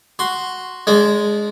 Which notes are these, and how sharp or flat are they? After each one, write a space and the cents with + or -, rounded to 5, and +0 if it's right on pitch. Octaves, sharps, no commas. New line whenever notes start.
F#4 +0 C6 +0
G#3 +0 D4 -30